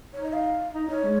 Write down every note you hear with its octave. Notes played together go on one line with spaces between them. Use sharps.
D#4 C#5
D#5
F5
D#4
D#4 C#5
G#3